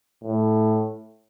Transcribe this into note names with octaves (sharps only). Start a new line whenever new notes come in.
A2